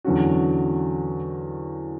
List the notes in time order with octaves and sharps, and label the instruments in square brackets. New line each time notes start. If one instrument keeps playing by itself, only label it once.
[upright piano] E2 D3 F#3 C#4 F#4